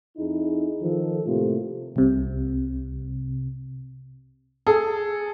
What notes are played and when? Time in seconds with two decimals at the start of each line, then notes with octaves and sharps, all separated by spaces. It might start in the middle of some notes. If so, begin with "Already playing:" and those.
0.17 F2 D#4 E4 G#4
0.82 D#3 F3 A4
1.25 A2 C3 A3 A#3 F4
1.96 C2 C3
4.67 G#4 A4